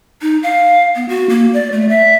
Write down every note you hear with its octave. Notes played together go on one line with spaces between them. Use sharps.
D#4
F5
B3
F#4
A#3
D5
A3
E5